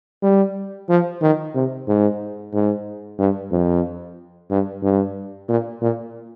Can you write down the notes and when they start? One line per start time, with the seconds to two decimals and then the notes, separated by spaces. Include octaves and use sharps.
0.23 G3
0.89 F3
1.22 D#3
1.55 C3
1.88 G#2
2.53 G#2
3.19 G2
3.52 F2
4.50 G2
4.83 G2
5.49 A#2
5.81 A#2